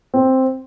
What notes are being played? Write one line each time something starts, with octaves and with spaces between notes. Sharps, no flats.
C4